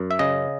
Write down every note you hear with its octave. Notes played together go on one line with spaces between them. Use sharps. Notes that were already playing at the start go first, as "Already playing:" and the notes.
Already playing: F#2
E5
C#3 D#5